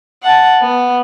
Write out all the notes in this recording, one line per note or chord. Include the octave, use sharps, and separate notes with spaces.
F#5 A5
B3